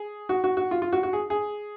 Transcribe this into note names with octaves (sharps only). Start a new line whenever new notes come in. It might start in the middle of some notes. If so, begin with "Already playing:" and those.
Already playing: G#4
F#4
F#4
F#4
F4
F4
F#4
F#4
G#4
G#4